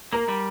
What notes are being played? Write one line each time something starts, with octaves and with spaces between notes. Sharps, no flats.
A#3 A#4
G3